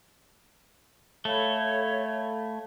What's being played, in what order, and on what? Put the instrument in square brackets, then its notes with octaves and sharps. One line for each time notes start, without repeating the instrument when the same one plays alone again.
[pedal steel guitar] A3 [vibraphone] A4 F5 B5 [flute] C#5